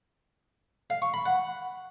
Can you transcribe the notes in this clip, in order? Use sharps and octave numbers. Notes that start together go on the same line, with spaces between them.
F5
C#6
B5
F#5